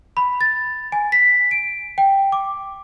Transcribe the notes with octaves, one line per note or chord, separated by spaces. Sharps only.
B5
A6
G#5
B6
D7
G5
D6